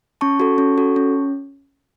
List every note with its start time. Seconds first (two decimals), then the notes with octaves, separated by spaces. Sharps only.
0.21 C#4 A5 C#6
0.40 F#4 A4
0.58 C#4
0.78 F#4 A4
0.96 C#4